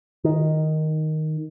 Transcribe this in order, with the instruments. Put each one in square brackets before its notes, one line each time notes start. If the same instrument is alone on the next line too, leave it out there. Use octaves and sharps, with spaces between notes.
[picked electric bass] D#3